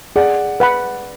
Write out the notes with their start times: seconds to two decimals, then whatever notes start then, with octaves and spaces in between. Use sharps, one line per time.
0.16 G#4 D5 F#5
0.60 B4 F#5 B5